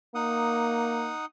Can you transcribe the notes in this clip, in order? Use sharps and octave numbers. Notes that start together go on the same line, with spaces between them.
A#3 D#4 F#5 D#6